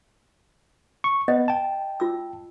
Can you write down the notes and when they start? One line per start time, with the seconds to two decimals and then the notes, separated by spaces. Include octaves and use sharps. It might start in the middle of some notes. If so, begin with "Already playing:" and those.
1.04 C#6
1.28 B3 D#5
1.48 G5 A5
2.00 F4 E6